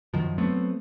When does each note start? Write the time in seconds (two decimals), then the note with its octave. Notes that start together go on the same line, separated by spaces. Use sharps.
0.14 F#2 D#3 F3
0.38 F#3 A3 B3 C4